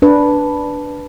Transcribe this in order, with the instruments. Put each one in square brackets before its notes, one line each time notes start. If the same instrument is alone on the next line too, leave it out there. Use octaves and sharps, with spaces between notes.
[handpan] D4 B4